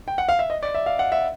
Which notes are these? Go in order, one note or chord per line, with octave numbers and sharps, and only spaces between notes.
G5
F#5
F5
E5
D#5
D5
E5
F5
F#5
E5